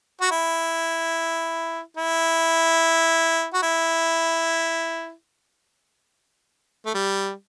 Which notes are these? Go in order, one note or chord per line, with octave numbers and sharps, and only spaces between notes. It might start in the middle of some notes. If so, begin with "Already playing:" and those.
F#4
E4
E4
F#4
E4
A3
G3